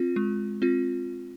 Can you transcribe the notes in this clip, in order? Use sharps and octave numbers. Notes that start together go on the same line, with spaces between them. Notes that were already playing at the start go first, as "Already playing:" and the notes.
Already playing: C4 F4
G#3
C4 F4